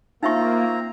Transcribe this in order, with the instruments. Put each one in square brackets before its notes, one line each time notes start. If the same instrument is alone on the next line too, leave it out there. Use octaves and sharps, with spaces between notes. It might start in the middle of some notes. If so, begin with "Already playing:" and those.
[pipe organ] A#3 [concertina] C4 A#5 [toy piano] D#4 E5 C#6 [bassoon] F4